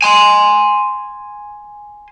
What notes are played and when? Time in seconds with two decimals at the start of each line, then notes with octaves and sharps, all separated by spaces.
0.02 G#5 C6